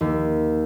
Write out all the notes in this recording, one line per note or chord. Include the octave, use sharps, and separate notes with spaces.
D#2